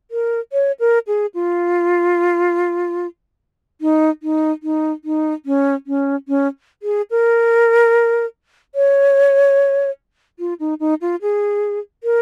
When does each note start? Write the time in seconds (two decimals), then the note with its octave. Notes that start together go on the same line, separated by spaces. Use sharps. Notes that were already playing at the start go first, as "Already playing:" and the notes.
0.11 A#4
0.53 C#5
0.80 A#4
1.07 G#4
1.34 F4
3.81 D#4
4.23 D#4
4.63 D#4
5.05 D#4
5.46 C#4
5.87 C#4
6.28 C#4
6.83 G#4
7.11 A#4
8.75 C#5
10.39 F4
10.60 D#4
10.80 D#4
11.01 F4
11.22 G#4
12.04 A#4